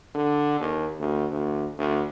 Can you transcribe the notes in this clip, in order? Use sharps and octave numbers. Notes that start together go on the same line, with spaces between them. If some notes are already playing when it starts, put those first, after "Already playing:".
D3
D#2
D2
D2
D2